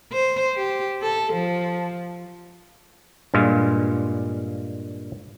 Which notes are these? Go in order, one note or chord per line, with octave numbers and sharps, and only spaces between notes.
C5
G4
A4
F3
G2 A#2 G#3 F4